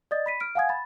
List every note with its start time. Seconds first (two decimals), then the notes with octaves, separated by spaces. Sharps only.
0.11 D5 D#5 D#6 A6
0.26 B5 B6 D#7
0.40 F6 D7
0.55 F5 F#5 G#5 D#6 G#6
0.69 B5 A6